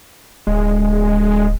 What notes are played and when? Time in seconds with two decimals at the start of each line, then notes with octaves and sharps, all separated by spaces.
0.47 D1 G#3